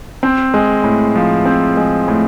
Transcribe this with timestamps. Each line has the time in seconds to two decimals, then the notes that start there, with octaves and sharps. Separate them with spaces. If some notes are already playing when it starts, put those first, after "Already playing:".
0.23 C4
0.54 G#3
0.84 A2
1.16 F3
1.45 C4
1.77 G#3
2.08 A2